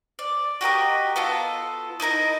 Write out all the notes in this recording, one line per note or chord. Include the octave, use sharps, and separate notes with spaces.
D5
F#4 G4 A#4 D#5
B3 F4 A4
D#4 E4 A#4 D#5